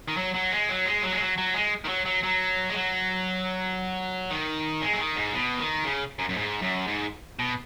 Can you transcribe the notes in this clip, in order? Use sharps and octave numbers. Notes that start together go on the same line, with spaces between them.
D#3
F#3
F#3
G#3
F#3
G#3
F#3
G#3
F#3
F#3
G#3
D#3
F#3
F#3
F#3
G#3
F#3
D#3
G#3
F#3
D#3
G#2
B2
D#3
C#3
F#2
F#2
G#2
F#2
G#2
B2